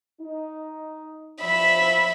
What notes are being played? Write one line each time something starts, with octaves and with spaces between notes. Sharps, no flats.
D#4
F3 E5 B5